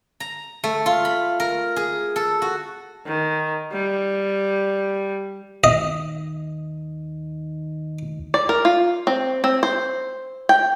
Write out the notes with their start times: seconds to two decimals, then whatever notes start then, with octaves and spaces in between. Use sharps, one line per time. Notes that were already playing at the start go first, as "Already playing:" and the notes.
0.20 A#5
0.64 A3
0.86 F4
1.05 B5
1.40 A#4
1.76 G#4
2.16 A4
2.42 F#4
3.06 D#3
3.72 G3
5.64 D#2 D#3 D#5
8.34 D5
8.49 A#4
8.65 F4
9.07 C4
9.44 C4
9.63 C5
10.49 G5